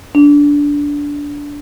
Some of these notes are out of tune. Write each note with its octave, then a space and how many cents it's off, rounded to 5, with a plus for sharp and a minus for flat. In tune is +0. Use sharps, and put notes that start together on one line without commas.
D4 -15